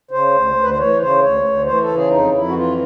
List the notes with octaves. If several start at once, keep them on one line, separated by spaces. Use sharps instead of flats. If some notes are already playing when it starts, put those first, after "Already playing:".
C#3 C5
D2
D2
B4
C5
E3 C#5
C#3 C5
D2 C#5
D2
E3 C5
A4
C#3
G#4
F2 D#4
F2 E4
F#4
E3 F4